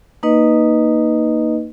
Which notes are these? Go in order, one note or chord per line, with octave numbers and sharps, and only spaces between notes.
A#3 D#4 B4 D#5